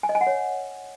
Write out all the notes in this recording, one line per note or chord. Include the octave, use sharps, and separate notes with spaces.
G#5
D#5
G#5
F#5
C#5